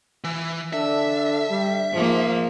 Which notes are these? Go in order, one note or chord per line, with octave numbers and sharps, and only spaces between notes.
E3
D3 D4 A4 E5
G3
G#2 F3 A#3